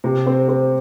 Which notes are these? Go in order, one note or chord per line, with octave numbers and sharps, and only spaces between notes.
C3
C4
C4